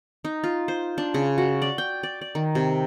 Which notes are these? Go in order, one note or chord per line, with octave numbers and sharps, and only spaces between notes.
D#4
F4
C5
D4
C#3
F#4
D5
G5
D5
D5
D#3
C3